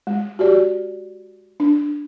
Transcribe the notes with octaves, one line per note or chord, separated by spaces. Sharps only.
G#3
F#4 G4 D5
D4